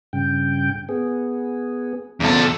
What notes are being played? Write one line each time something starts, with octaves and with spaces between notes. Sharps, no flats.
G2 C#3 G5
B3 G#4
E2 B2 A4